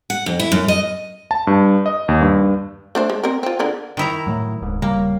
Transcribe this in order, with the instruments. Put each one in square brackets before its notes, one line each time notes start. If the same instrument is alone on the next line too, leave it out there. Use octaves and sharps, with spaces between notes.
[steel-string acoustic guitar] F#5
F2
E4
F#2
D#5
[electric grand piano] A5
G2
D#5
D#2
G2
[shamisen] A3 D4 C5
G#3
C4 A#4
C4 F4
D3 G#4 A#4
[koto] D#3 E4 A#5
[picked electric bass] A2 F#3
D1 G#2
[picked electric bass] D#1 C#3 G3 [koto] A#3